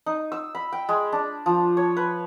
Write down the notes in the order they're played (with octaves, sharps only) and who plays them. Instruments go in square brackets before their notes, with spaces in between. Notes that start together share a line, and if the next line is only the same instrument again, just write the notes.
[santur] D#4
E6
B5
G5
G#3
D4
F3
C#5
B4